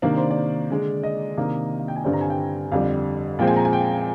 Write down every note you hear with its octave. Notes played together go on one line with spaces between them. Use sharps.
C3 D#3 A#3 D4 D5
C5
D5
D3 G#3 D4
D#5
C3 D#3 A#3 D4
F5
G5
G#5
G2 D3 G3 C4 D5
A#5
G#5
G5
F2 D3 G3 D4 F5
A#2 F3 G#3 C4 G5
G#5
A#5
G#5
G5